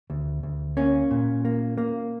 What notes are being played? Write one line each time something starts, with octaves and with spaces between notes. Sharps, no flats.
D2
D2
A#3 C#4
A#2
A#3
A#3